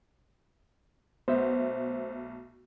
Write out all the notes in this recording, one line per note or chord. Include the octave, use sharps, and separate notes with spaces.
B1 A3 B3 C5 E5